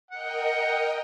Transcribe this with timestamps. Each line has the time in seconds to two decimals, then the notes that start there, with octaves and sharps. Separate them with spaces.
0.11 A#4 D#5 F#5 G5